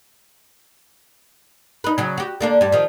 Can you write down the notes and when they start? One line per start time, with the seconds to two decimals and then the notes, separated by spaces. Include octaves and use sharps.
1.84 D#4 B4
1.98 C#3 F#3
2.18 F#4 G4
2.41 D3 A#3 D4
2.61 G2 G3
2.72 D#3 F3